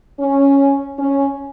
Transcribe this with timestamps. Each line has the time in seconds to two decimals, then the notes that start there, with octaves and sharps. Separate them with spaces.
0.20 C#4
0.99 C#4